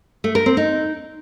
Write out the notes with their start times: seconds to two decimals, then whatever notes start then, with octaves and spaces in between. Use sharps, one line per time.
0.24 A3
0.35 A#4
0.46 C4
0.57 D#4